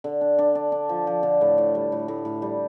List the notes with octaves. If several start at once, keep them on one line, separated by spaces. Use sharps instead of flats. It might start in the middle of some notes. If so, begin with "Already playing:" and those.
D3
D4
D4
D4
D4
F3
F3
D3
A2
A2
G3
A2
A2
A2
G3